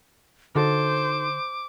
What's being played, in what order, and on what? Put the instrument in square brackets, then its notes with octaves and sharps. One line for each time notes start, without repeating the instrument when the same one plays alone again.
[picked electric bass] D3 [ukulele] D#4 F#4 A4 [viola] C5 [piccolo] D6